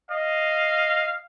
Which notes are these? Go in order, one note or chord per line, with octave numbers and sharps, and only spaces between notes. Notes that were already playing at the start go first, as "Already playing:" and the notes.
D#5 F5